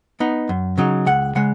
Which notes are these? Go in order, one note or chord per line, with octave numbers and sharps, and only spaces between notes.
B3 D#4
F#2
C#3 F#3 D#4
C#2 F#5
C#3 G#3 F#5